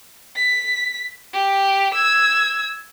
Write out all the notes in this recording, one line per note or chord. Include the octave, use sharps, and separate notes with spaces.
B6
G4
E6 G#6